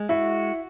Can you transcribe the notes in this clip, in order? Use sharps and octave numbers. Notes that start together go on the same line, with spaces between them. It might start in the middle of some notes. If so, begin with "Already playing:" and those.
Already playing: G#3
E4 F#4